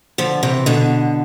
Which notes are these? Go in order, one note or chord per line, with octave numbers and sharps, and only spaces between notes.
D3 F3
C3 E3
B2 D3